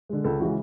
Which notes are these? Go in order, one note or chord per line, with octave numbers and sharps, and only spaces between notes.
D3 G#3
C#2 A4
C#3 E3 G#3 F#4